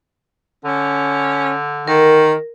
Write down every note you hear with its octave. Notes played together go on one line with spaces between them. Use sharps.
D3 C#4
D#3 A#4